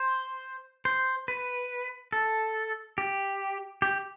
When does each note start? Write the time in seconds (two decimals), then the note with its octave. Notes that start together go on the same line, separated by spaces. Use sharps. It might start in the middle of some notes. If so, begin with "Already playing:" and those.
Already playing: C5
0.85 C5
1.28 B4
2.12 A4
2.98 G4
3.82 G4